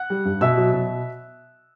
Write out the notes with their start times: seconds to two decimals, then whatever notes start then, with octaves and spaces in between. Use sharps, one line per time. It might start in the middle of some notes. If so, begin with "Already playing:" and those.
Already playing: F#5 F#6
0.10 G3
0.25 G2
0.41 B2 E5 E6
0.57 F#3
0.73 B2